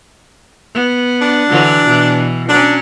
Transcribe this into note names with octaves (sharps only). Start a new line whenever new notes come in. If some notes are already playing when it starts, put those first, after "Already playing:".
B3
D4
D3 E3 F#3
B2 E3
F#3 C#4 D4